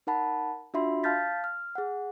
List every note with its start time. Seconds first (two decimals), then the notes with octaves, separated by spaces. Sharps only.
0.07 D#4 A#4 F#5 A5 B5
0.74 D4 F4 F#4 E5 B5 C6
1.04 F5 A5 F6 G6 A6 B6
1.44 F6
1.75 G#4 F#5